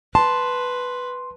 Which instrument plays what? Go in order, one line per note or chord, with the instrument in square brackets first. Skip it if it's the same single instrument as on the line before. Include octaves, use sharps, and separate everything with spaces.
[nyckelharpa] B4 [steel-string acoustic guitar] A5 [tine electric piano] C6